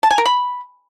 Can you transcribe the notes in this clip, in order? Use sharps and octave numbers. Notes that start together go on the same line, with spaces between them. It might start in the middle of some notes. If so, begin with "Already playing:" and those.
A5
G#5
A#4
B5